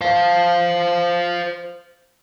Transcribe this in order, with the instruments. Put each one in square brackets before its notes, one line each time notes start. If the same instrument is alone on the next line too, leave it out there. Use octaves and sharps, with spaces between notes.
[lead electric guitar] C5 F5